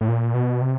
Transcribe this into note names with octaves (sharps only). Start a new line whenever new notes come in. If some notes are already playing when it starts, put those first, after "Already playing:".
A2
A#2
B2
C3